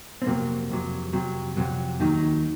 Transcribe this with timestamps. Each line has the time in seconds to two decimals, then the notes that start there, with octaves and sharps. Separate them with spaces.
0.22 C4
0.26 F2 C3 F#3 A#3
0.70 F2 C3 F#3
1.13 F2 C3 F#3
1.57 F2 C3 F#3
2.00 D#2 D#3 F#3 D#4